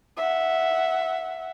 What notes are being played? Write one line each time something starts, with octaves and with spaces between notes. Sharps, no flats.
E5 F#5